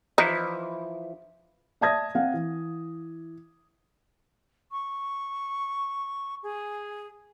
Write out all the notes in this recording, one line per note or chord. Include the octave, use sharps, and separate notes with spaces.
E3 F3 D#4 E4
D5 E5 A5 D#6 G#6 A#6
C4 F5 F#5
E3
C#6
G#4